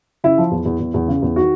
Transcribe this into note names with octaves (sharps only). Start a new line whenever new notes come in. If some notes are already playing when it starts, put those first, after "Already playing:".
C#3 E4
F3
E2
E2
E2
E2
C#3
E2
D#3 F#4